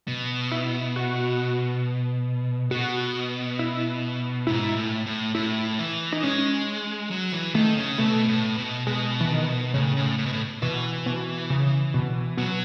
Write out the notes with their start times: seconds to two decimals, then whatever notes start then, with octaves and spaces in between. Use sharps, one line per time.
0.08 B2
0.52 E4
0.96 F#4
2.71 B2 F#4
3.59 E4
4.47 G#2 E4
4.76 A2
5.06 A2
5.35 A2 E4
5.79 E3
6.12 D#4
6.23 G#3 C#4
7.11 F#3
7.32 E3
7.54 D#3 A3
7.77 C#3
7.98 B2 A3
8.28 A2
8.58 B2
8.87 B2 G#3
9.21 E3
9.31 D#3
9.74 A2 C#3
9.97 A2
10.18 A2
10.26 B2
10.33 A2
10.62 B2 E3
11.06 B2
11.50 C#3
11.94 B2
12.37 B2 F#3